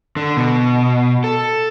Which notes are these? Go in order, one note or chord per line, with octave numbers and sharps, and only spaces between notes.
D3
B2
A4